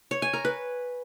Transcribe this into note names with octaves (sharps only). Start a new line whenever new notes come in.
C#5
G#5
A#4
B4